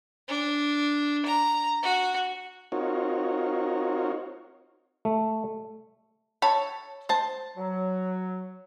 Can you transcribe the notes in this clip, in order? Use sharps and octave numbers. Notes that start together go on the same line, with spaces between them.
D4
A#5
F#4
C4 D#4 F4 F#4 A#4 C#5
A3
A4 C#5 B5
C5 A5
F#3